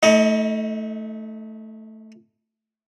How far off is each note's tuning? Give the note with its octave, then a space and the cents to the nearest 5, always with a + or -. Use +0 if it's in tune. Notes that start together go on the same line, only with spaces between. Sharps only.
A3 +0 D#4 +45 D#5 +0